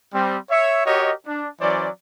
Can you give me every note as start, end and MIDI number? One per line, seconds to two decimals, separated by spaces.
0.14 0.38 55
0.14 0.38 60
0.50 0.84 73
0.50 0.84 76
0.86 1.13 66
0.86 1.13 67
0.86 1.13 70
0.86 1.13 73
0.86 1.13 75
1.26 1.47 62
1.61 1.88 52
1.61 1.88 54
1.61 1.88 61
1.61 1.88 72
1.61 1.88 74